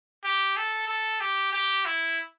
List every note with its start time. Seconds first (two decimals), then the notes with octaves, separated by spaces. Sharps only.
0.24 G4
0.57 A4
0.88 A4
1.20 G4
1.52 G4
1.85 E4